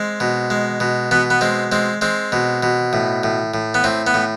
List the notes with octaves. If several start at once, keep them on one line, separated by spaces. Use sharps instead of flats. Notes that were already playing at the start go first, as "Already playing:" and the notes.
Already playing: G#3 C4
B2
G#3
B2
B2 B3
B3
G#3 C4
G#3 C4
G#3 C4
B2
B2
A2
A2
A2
B3
A2 C4
B3
A2